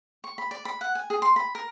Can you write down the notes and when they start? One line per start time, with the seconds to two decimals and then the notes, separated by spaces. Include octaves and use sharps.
0.24 C#6
0.38 B5
0.51 D5
0.65 B5
0.81 F#5
0.95 G#5
1.10 G#4
1.22 C6
1.36 B5
1.55 A#4